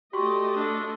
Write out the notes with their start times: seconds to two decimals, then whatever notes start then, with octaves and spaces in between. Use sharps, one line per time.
0.13 A3 F#4 G4 D5 D#5 C6 C#6
0.56 D4 A4